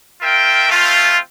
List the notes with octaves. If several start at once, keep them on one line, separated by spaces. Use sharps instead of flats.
F4 A#4 E5 G5
A3 C4 F4